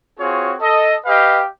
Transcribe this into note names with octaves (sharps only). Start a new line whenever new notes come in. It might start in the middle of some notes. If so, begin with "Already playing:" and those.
C4 F4 F#4 G#4 C#5
A4 D#5
G4 B4 D#5 F5 G5